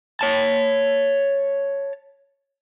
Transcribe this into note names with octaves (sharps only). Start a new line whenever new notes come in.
C#5 A5